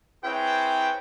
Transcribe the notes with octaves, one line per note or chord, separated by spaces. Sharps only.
C4 E4 G#4 B4 C#5 G5